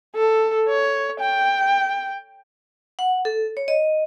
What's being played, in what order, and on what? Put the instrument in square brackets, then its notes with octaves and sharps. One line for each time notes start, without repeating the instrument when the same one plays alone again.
[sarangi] A4
C#5
G5
[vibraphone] F#5
A4
C#5
D#5